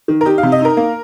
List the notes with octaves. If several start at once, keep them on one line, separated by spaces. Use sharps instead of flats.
D#3
A#4
D#4 G4
F5
C3
D#5
D#4 A#4
A#3